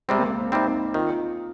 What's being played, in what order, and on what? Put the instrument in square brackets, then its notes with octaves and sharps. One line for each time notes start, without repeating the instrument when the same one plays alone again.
[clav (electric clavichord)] C3 G3 C4 [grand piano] G#3
[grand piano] A#3
A#3
C4
[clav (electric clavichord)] C3 G3 C4 [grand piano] D#4
[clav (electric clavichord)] D#3 [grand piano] F4